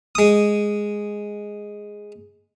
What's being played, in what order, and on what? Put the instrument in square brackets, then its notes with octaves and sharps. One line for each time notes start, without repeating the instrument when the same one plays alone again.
[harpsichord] G#3 D#6